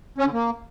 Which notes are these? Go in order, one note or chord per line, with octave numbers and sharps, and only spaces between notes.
C#4
D3
A#3